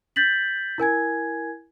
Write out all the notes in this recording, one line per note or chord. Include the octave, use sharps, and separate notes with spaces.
G6 A6 B6 F#7
E4 A#4 G#5 G#6